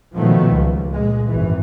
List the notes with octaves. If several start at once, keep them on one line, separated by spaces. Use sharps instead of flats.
B2 D#3 F3 F#3 A3 B3
C#2
A#2 G#3
G#1 F#2 E3